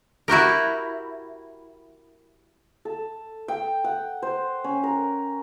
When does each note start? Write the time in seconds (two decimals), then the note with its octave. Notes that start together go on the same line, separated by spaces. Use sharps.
0.28 E4 F#4 G4 A#4
2.85 A4
3.48 G5
3.84 F#5
4.22 C5
4.64 C#4
4.83 A#4